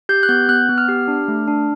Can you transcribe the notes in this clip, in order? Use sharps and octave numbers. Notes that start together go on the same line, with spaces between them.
G4 G6
F#6
B3 G6
B3 F#6
B3
F6
G4
D4
A3
D4